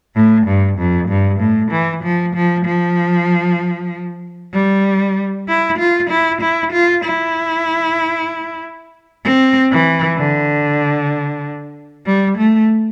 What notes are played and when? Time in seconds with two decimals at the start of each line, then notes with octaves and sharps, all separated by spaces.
0.15 A2
0.47 G2
0.78 F2
1.09 G2
1.40 A2
1.71 E3
2.03 F3
2.35 F3
2.65 F3
4.53 G3
5.48 E4
5.78 F4
6.10 E4
6.41 E4
6.72 F4
7.05 E4
9.24 C4
9.71 E3
10.17 D3
12.06 G3
12.38 A3